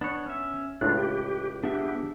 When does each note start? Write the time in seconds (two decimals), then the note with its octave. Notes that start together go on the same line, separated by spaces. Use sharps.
0.01 B3 D4 C#5
0.26 C#4 E5
0.81 C#2 A2 D4 F4 F#6
0.97 G4
1.64 B3 D4 G4 G#4 E5